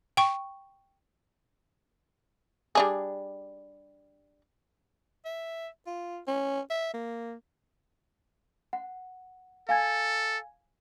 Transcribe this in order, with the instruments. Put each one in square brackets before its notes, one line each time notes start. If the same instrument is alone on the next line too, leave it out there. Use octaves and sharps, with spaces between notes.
[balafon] G5 C#6
[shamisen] G3 D4 G#4
[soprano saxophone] E5
F4
C#4
E5
A#3
[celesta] F#5
[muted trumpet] A4 [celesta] F5 G#5 G#6